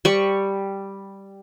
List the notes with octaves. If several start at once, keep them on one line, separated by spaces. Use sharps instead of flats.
G3 C#6